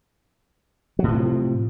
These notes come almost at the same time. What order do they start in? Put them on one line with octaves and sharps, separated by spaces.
F#3 A2 F3 C3